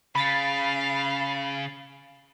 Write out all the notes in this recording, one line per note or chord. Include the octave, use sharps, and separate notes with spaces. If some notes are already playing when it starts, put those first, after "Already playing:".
C#3 F5 B5 A6 B6